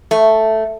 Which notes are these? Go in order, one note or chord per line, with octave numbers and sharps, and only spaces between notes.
A3